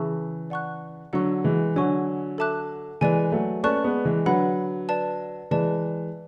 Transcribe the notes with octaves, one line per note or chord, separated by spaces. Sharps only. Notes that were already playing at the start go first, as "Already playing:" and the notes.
Already playing: C#3 E3 E5 A5 C#6 E6
D5 F#5 A5 C#6 F#6
D3 F#3 F#5 C#6 E6
E3 G#3
D3 F#3 C#5 G#5 C#6
A4 E5 A5 D6 F#6
E3 G#3 B4 D5 G#5
F#3 A3
A3 C#4 B4 D5 A5 C#6 F#6
G#3 B3
E3 G#3
D3 F#3 B4 F#5 B5
B4 D5 A5
E3 G#3 B4 D5 A5